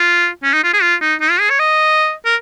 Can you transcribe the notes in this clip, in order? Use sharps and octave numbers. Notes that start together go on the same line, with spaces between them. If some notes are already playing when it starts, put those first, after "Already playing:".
Already playing: F4
C#4
D#4
F4
G#4
F4
D#4
D#4
F4
G#4
C#5
D#5
A#4